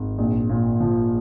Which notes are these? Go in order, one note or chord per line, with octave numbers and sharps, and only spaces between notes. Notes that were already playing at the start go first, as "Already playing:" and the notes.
Already playing: G#1
A#1
A#2
F3